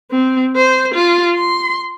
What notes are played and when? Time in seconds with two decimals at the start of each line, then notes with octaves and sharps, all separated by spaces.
0.11 C4
0.56 C5
0.94 F4
1.34 C6